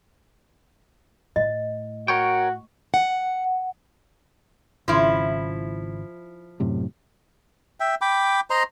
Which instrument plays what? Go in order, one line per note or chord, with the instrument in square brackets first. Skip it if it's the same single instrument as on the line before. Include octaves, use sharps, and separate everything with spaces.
[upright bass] A2 [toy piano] D#5
[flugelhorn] F#4 [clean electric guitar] A#4 C#5 G5 [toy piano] C#6
[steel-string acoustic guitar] F#5
[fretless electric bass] G#1 C#3 [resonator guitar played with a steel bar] F3 E4
[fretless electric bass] F#2 A2 C3
[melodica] E5 G5
G5 B5 D6
C5 D#5 A#5 C6